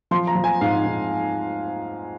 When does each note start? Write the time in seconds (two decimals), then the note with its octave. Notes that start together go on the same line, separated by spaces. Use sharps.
0.11 F3 C6
0.27 A#5
0.35 F3
0.44 G#5
0.61 G#2 F5
0.86 G#2